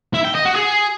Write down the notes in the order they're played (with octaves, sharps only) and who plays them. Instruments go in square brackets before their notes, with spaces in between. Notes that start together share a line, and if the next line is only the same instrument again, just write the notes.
[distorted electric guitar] E4
G5
D#5
F#4
G#4